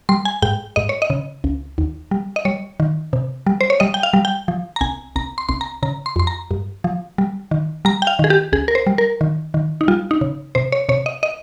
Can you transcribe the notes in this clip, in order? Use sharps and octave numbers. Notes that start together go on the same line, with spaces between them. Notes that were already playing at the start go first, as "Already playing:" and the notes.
G3 C6
G#5
G#2 G5
G#2 D#5
C#5
D#5
C#3
C#2
D#2
G3
D#5
G3 C#5
D#3
C3
G3
C5
C#5
G3 D#5
G5
F5
G3
G5
F3
A#5
C2 G#5
C2 A#5
C6
C2 C6
A#5
C#3 A#5
C6
F2 C6
A#5
G2
F3
G3
D#3
G3 A#5
G5
F5
D#3 G#4
G4
C#2 G#4
A#4
C5
G3
A#4
D#3
D#3
D#4
G3 F4
D#4
C#3
C3 C5
C#5
C3 C#5
D#5
D#5